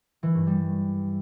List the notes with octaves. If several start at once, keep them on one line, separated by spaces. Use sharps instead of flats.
E3
G2
G3